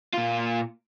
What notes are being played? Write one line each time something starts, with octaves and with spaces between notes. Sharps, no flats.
A#2 F4